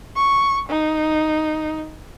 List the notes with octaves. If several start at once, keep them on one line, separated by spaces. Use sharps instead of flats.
C#6
D#4